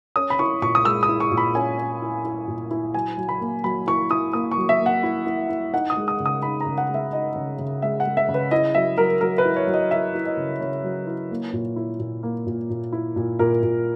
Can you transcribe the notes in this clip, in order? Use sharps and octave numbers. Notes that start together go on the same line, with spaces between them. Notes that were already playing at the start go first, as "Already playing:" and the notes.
C#4 D#6
B5
E4 C#6
A#2 C#6
D#6
G#3 E6
D#6
E4
C#6
A#2
B5
C#4 G#5
C#4
E4
E4
A#2
E4
F#3 G#5
F#3
B5
A#3
F#3 B5
E4 C#6
E4 D#6
A#3 D#6
C#6
F#3
E5
A#3
F#5
E4
E4
E4
D#4 F#5
D#6
G#3
D#6
C#3
D#6
D#4 B5
A#5
C#3
F#5
G#3
E5
D#4 D#5
C#3
C#3
G#3 E5
F#5
G#3
E5
C#3
B4
E4 D#5
F#3 E5
F#3 A#4
F#3 A#4
B4
E4
C#5
F#3
D#5
E4 E5
E4
D#5
C#3
C#3 C#5
F#3
E4
A#3
A#2
E4
A#2
A#3
A#2
A#2
E4
A#2
A#2 A#4
A#2